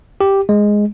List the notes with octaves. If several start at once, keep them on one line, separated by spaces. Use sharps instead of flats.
G4
G#3